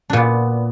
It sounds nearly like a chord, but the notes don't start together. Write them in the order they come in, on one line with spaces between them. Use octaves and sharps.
D4 A#2 B3